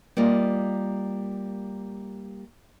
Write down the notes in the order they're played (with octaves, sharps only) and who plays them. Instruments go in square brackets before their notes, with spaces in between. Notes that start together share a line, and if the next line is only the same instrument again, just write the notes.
[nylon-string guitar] G3 A#3 F4 D#5